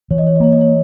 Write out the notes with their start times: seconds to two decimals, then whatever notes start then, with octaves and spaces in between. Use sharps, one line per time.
0.11 E3 C#5
0.18 D#5
0.27 C#5
0.36 D#5
0.40 A#3 C#5
0.52 D#5
0.61 C#5